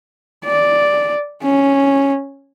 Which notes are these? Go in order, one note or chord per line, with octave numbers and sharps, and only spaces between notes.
D5
C#4